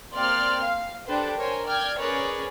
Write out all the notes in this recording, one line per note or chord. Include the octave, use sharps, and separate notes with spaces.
A#3 C4 G4 D5 C6 F6
F5
D4 G4 A4 B4 C5
A#4 C5 C#5 G#5
D5 G5 F6 G#6
C#4 G#4 A#4 B4 C#5 D5